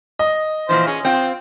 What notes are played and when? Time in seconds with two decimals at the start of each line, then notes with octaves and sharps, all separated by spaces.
0.19 D#5
0.69 A#2 E3 F3 C5
0.87 C#4 G#4
1.05 C4 F4 G5